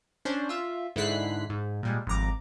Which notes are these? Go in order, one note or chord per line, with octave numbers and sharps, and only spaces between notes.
C#4 D4 C5
F4 E5
G#2 D3 E4 F#6 B6 C7
G#2
A#2 G3 G#3
G#1 F2 A#5 D6